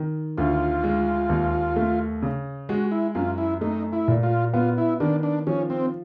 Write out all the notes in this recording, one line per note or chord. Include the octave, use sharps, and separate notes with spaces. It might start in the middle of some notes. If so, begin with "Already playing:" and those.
Already playing: D#3
D2 F4
G#3
D#2
A3
C#3
G#3 F#4
E4
F#2 F4
E4
A3 D#4
E4
A#2
F4
B3 F4
E4
D#3 D4
D4
F3 C#4
C4